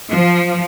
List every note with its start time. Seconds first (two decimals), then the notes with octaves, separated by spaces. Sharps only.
0.12 F3